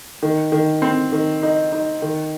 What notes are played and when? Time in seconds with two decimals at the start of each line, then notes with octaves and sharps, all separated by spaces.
0.23 D#3
0.52 D#3
0.82 C4
1.12 D#3
1.43 D#4
1.72 D#4
2.02 D#3